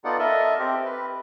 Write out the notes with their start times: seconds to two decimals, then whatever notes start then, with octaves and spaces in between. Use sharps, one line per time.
0.04 B3 D#4 F4 A4 D5 F#5
0.19 A4 A#4 D#5 E5
0.59 C4 G4
0.85 B4